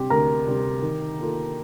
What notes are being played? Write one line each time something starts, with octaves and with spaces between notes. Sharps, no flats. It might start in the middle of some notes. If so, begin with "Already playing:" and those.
Already playing: C3 G3 C4 G4
D2 A#4 A#5
C3 G3 C4
D#3
A#3 F4 A4